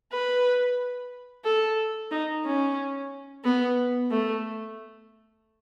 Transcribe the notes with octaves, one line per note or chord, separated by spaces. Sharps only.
B4
A4
D#4
C#4
B3
A3